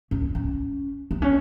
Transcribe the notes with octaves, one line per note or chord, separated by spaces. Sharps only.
C#4
C#4
B3
C#4